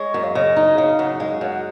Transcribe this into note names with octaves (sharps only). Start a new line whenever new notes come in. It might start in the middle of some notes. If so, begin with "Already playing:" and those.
Already playing: G#3 C#5
F#2
F5
C#3 D#5
D#4
C#3 F5
F#2 F#5
G#3 F5
F#2 F#5